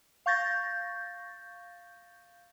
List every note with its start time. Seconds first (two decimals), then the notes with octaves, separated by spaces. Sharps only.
0.26 F5 C#6 G6 A6 A#6